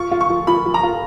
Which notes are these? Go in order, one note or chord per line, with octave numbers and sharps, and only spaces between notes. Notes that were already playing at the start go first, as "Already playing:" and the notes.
Already playing: F4 C#6
F4
C#6
F3
F3 B5
F3
A#5
F4